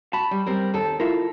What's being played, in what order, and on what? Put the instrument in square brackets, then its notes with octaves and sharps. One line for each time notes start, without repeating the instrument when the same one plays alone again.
[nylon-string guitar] F#4 [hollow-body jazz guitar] A5 B5
[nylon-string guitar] G3
G3 C4 A#4
D#2 A4
[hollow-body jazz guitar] E4 F4 A#4 [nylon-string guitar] A4